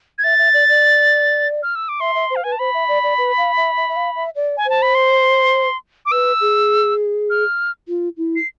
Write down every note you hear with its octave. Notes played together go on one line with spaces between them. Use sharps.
G#6
E5 A6
E5
D5
D5
F6
E6
D6
E5 C6
E5
C5
F5
B4 G#5
A5
C5 B5
E5
D5
D5
B4
F5
E5
E5
E5
F5
E5
D5
G#5
C5 A5
B5
C6
D6
B4 E6
G#4
F6
F4
E4
C7